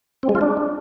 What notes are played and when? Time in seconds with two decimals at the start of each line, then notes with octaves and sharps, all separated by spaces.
0.23 C4
0.29 G#3
0.35 F4
0.41 D4